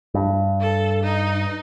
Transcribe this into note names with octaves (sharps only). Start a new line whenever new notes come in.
G2
A4
D#4